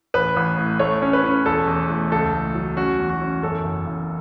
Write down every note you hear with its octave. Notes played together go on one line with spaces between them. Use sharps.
A1 B4
A1
A2
A3 C#5
C#4
B4
C#4
E1 A4
E2
A3
C#2 A4
A3
F#3
C#4 F#4
E2
F#4
C#4
F#2 A4
F#1
F#1